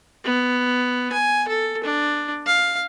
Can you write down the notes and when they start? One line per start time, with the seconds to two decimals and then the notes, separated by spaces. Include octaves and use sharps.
0.24 B3
1.13 G#5
1.48 A4
1.84 D4
2.47 F5